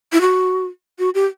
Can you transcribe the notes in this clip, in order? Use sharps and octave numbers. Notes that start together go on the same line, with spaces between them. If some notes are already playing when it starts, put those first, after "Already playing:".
E4
F#4
F#4
G4